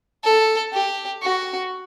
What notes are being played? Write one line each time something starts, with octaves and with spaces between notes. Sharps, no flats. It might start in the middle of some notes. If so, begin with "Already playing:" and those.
A4
G4
F#4